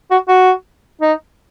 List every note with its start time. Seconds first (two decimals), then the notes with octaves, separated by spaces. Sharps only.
0.11 F#4
0.29 F#4
1.02 D#4